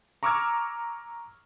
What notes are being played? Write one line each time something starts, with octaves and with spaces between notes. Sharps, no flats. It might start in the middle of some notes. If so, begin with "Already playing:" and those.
A#5 C#6 D6 E6 F6 G#6